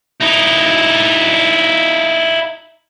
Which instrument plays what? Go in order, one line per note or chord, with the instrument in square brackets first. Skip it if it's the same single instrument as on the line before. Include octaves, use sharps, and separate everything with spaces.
[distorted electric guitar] D#4 E4